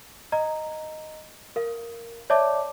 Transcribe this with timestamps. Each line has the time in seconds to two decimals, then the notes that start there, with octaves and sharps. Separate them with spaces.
0.32 D#5 A#5
1.56 A#4 F5
2.30 C#5 D5 E5 A5 D6